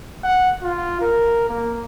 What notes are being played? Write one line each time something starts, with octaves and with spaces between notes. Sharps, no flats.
F#5
F4
A#4
A#3